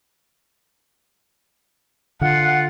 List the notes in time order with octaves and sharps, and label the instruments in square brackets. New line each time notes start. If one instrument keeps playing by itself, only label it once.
[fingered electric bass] D3 [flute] F4 [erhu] F#5